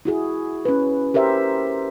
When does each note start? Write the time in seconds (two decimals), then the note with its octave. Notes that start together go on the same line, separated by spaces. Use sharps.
0.05 E4 F#4 G#4
0.65 C#4 B4
1.14 G4 A#4 C5 E5